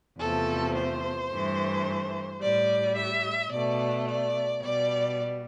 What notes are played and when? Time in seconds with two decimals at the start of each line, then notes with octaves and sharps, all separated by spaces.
0.19 E2 C3 F3 A3 A4
0.75 C5
1.29 G2 E3 A3
2.41 A2 G3 D5
2.96 E5
3.51 B2 A3 D5
4.07 D5
4.62 B2 G3 D5